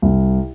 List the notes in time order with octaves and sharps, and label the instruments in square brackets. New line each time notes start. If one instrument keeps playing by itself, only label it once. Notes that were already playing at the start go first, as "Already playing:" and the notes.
[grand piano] C2